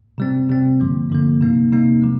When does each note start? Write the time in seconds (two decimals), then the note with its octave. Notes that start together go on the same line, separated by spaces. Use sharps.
0.18 C3 G3 C4
0.49 C3 G3 C4
0.80 G2 D3 F3 A#3
1.10 G2 D3 F3 A#3
1.41 C3 G3 A#3 D#4
1.72 C3 G3 A#3 D#4
2.02 C3 F3 G#3